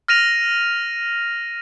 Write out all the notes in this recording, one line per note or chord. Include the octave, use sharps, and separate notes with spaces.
F6 A#6 D#7 F7